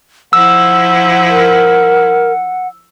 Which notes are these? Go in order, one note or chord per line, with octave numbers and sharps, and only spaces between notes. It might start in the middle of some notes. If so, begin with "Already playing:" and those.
F3 E4 F#5 E6
A#4